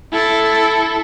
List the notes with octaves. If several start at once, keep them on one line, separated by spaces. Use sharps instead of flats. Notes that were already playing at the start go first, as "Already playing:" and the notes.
E4 A4